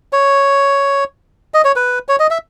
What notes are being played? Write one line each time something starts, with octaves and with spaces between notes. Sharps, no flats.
C#5
D#5
C#5
B4
C#5
D#5
E5